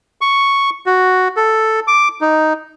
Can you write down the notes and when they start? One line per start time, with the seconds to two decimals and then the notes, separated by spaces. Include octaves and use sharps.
0.21 C#6
0.86 F#4
1.37 A4
1.88 D6
2.21 D#4